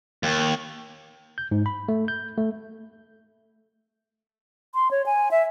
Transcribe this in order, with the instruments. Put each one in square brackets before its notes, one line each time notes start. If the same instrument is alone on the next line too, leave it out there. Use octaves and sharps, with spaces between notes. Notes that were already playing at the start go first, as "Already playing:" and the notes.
[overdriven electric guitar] D#2
[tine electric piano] G6
G#2
B5
A3
G6
A3
[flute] C6
C#5
G#5
E5